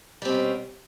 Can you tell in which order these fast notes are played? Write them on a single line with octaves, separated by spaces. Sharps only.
G3 C4 B2 C#4